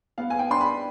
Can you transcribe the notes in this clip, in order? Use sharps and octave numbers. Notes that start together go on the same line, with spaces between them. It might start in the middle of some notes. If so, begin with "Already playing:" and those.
B3 F5
G#5
G5
D4 C6
B5